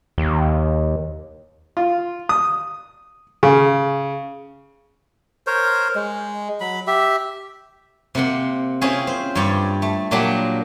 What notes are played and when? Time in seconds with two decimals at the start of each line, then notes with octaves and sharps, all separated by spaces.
0.18 D#2
1.77 F4
2.29 D#6
3.43 C#3
5.47 A#4 C5 C#5
5.95 G#3
6.61 F#3 B5
6.87 G4 E5
8.15 C3 A#3 F#5 C6
8.81 C4 C#4 E4 F4 G#4
9.07 C5
9.35 G2 C#5 D5 G5
9.82 A3
10.11 A#2 F#3 A#3 D4 G4 B5